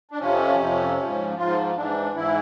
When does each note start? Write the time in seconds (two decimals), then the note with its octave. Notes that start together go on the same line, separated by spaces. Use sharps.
0.11 D4
0.20 F2 C3 F3 C#4
0.59 F2 C3 F3
0.98 G#2 F3
1.37 G#2 F3 F4
1.76 G#2 E3 D4
2.15 G#2 E3 E4